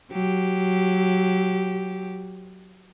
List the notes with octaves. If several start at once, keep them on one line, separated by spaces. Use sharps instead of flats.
F#3 G4